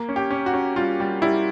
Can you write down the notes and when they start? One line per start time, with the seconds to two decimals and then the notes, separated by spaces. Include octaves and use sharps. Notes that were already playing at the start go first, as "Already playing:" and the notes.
Already playing: A#3
0.09 C#4
0.16 G4
0.30 C#4
0.46 F#4
0.54 C#4
0.76 G3 F4
1.00 G3
1.22 G3 E4